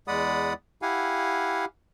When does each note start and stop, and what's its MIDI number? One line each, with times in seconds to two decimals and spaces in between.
0.08 0.53 40
0.08 0.53 56
0.08 0.53 74
0.08 0.53 78
0.08 0.53 83
0.08 0.53 87
0.82 1.65 64
0.82 1.65 67
0.82 1.65 77
0.82 1.65 78
0.82 1.65 80